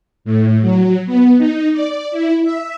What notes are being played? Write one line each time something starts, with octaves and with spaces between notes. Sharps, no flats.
A2
F#3
B3
D#4
D5
E4
E5